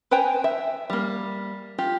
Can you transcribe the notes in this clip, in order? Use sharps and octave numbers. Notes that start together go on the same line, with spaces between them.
B4 C5 G5 G#5 A#5
E5
G3 A#3
F4 G4